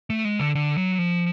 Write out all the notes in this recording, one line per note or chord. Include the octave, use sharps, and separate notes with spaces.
A3
G#3
D3
D3
F#3
F3